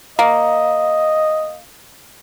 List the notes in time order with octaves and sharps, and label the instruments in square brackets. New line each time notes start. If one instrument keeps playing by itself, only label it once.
[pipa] A#3 [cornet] D#5